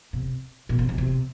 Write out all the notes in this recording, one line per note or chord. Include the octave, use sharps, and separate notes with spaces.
C3
A#2
C3
D#3
C3